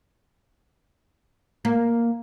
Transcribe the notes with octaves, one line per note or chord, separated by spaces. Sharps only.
A#3